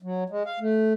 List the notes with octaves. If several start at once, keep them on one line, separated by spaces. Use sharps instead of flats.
F#3
G#3
F5
A3